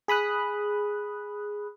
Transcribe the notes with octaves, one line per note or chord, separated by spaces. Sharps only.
G#4 B5 D#6 F#6